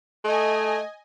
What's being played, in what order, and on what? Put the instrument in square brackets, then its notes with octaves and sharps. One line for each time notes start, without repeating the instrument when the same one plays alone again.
[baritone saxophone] A3 [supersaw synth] D#5 G#5